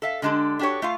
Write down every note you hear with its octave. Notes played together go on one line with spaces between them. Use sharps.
A4 E5 F5
D3 G#3 D4 G4 A4
D4 F#4 G4 A4 C#5
A3 F4 F5